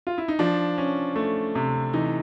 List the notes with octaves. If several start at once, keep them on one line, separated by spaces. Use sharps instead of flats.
F4
E4
D#4
F3 D4
C#4
A3
C3
E3 D#4